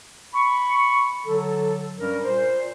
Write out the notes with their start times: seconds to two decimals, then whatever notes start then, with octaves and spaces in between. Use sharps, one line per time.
0.34 B5 C#6
1.26 D3 F#3 A4
1.98 G2 G3 C#4 A#4
2.24 A#2 C5